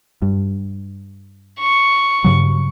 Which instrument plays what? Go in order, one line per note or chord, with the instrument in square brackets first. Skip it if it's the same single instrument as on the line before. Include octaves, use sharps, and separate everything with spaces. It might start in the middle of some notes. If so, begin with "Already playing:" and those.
[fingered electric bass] G2
[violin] C#6
[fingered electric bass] G2 C#3 F#3